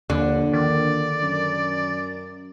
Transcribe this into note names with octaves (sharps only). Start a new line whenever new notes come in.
A#1 D#2 D3
D#3 D5
F#2